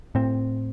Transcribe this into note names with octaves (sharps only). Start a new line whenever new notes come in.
A2 C4